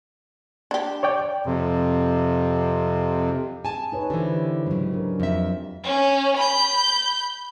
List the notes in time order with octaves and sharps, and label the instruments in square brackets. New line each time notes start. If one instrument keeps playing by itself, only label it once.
[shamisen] D4 G4
[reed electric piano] C#5 D5 G5
[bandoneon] F2 C3
[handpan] G#4 [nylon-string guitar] G#5 A5
[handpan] D#4 B4 C#5
[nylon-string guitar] D3 E3 [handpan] G4 C5
[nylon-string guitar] G#2 C#3 [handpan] F#3 G#3
[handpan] D4 A#4
[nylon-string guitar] F2 E5
[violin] C#4
B5 G6